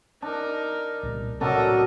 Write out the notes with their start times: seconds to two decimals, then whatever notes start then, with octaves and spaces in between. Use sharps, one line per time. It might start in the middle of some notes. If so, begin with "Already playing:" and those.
0.22 D4 D#4 A#4
1.03 C2 A#2
1.41 A2 C3 F#3 C4 D4 A4 A#4 D#5